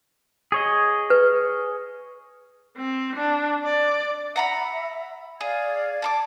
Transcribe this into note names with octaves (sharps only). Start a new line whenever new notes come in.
G#4 C#5 D#5
B4
C4
D4
D5
E5 F#5 A#5 B5
G#4 D5 F5 G#6
A5 C6 D6